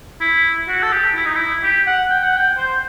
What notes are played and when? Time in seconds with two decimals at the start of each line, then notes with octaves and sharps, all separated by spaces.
0.21 E4
0.68 F#4
0.83 A4
0.92 G4
1.15 E4
1.25 D#4
1.35 E4
1.63 G4
1.87 F#5
2.10 G5
2.23 F#5
2.37 G5
2.57 C5